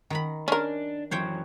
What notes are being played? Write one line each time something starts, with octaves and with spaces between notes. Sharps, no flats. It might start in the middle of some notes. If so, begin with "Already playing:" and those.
D#3 A#5 B5
C#4 D4 A#4
F#2 E3 F#3 C5 C#5 G5